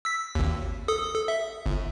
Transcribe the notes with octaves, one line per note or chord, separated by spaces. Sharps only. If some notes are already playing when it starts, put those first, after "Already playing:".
E6 B6
G#1 D#2
A4 D#6
A4
E5
G1